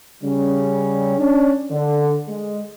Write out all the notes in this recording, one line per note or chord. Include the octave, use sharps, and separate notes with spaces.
C#3 G3 C#4
C#4 D4
D3
G#3